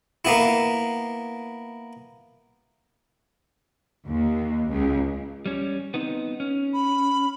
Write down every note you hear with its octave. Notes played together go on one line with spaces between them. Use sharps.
A#3 B3 E4
D#2
C#2
G3 C#4
B3 C4 D#4
C#4
B5